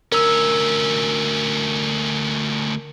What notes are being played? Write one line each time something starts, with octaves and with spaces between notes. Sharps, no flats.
D2 C#4 A#4 E6